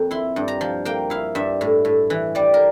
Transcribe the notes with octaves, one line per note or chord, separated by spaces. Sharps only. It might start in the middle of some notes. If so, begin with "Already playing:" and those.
Already playing: F2 A#3
E4 C6
G2
A#5
F3
A#3 G5
E4 F5
G2 E5
A2
A2
E3
G3 D5
A#4